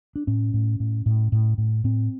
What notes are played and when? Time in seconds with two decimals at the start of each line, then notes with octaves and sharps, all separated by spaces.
0.16 D4
0.27 A2 C#4
0.54 A2
0.80 A2
1.06 A2
1.32 A2
1.58 A2
1.84 A2 C4